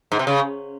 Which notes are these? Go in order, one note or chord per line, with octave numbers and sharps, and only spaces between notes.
G#2
C3
C#3